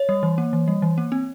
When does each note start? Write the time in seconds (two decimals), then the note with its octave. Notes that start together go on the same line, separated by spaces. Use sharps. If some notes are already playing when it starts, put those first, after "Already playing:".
Already playing: C#5
0.09 G3
0.23 E3
0.38 A#3
0.53 E3
0.68 G3
0.82 E3
0.98 A#3
1.12 C4